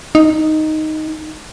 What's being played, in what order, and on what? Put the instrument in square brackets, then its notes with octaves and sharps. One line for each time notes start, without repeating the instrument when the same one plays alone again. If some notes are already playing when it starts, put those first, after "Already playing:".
[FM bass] D#4